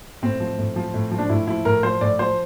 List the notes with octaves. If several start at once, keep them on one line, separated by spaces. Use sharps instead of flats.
A2 C4
F3
A2
F3
A2
F3
D4
A2 E4
F3 E4
A2 A#4
F3 C5
A2 D5
F3 C5